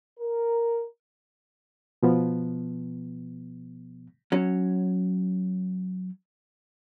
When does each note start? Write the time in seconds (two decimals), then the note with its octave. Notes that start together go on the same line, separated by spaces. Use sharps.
0.20 A#4
2.03 B2 F3 B3
4.32 F#3 C#4